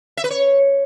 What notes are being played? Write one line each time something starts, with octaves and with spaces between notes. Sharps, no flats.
E5
B4
C#5